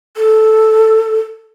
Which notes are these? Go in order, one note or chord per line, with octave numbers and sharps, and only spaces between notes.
A4